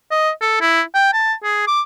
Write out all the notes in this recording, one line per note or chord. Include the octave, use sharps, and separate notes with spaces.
D#5
A4
E4
G5
A5
G#4
D6